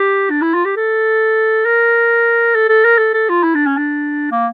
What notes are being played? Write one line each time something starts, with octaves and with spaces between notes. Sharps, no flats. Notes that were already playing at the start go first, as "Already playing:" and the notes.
Already playing: G4
D4
E4
F4
G4
A4
A#4
A4
A4
A#4
A4
A4
F4
E4
D4
C#4
D4
A#3